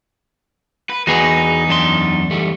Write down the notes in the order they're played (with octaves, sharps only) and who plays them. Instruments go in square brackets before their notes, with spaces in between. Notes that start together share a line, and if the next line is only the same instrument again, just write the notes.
[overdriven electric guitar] B4
[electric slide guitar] E2 B3 G#5 [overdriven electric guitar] D#4 [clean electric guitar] F#4 G#4 B4
[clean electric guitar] F#2 D4 C6
[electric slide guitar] E2 G3 A3